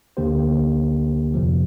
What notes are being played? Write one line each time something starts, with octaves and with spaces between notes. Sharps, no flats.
D2 D3 A#3 G4 C5
F2 C3 F3